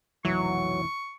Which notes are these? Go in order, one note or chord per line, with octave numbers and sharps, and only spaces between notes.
F1 B1 E3 F#3 C#6